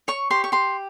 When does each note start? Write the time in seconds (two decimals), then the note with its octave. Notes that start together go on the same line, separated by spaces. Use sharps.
0.08 C#5 C#6
0.30 G4 C6
0.44 C#6
0.52 G4 C6